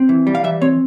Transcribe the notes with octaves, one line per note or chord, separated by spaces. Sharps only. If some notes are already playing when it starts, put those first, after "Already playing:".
Already playing: C4
E3
G3
F5
E3 E5
C4 C#5